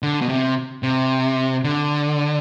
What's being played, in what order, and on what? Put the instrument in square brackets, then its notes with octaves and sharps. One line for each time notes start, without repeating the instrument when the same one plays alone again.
[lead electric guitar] D3
B2
C3
C3
D3